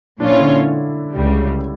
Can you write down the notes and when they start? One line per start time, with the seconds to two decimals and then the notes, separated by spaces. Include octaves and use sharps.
0.20 A#2 F3 C#4 D4 F4 C#5
0.30 E4
0.39 D3 D4
1.14 C#2 C#3 G3